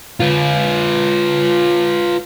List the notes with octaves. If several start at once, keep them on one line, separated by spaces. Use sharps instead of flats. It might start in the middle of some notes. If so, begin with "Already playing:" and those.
F4 B4